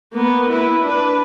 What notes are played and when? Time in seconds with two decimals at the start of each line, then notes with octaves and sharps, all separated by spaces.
0.13 A#3 B3
0.49 E4 B4
0.84 D4 B4